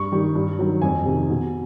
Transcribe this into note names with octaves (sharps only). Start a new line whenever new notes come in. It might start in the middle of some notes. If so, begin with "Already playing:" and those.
Already playing: G2 C#6
D#3 G3
G2
D#3 F#3
F2 G#5
C3 D#3
B2